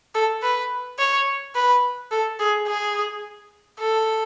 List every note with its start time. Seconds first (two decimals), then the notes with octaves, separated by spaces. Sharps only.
0.15 A4
0.42 B4
0.99 C#5
1.55 B4
2.11 A4
2.39 G#4
2.67 G#4
3.79 A4